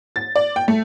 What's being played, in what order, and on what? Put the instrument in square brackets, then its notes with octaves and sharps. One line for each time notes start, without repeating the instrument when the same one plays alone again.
[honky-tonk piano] A6
D5
G5
A3